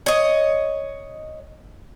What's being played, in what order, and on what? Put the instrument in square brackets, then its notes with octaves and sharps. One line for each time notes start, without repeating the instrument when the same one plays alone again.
[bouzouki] C#5 D#5